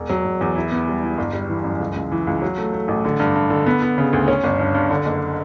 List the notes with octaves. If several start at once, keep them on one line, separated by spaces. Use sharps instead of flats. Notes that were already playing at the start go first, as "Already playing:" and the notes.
Already playing: E1
F#3
E1
E2
E4
B3
G3
E4
G1
G3
E3
F#2
C#2
C#2
E3
C#2
F#3
A3
A3
A1
D3
G2
G2
D3
B3
B3
C#3
D2
C#4
G1
G2
G2
D3
F#1